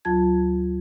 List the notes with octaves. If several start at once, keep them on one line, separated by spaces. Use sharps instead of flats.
D2 F#3 F4 A5 G#6